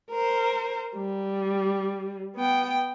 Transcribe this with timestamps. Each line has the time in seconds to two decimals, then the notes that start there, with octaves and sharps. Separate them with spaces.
0.11 A#4 C5
0.96 G3
2.36 B3 G5